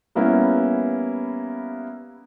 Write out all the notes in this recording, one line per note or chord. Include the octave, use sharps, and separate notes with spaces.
G3 A#3 B3 C#4 E4